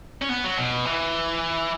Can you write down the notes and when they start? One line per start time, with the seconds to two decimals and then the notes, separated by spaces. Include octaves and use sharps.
0.22 C#4
0.29 B3
0.44 F#3
0.57 B2
0.85 E3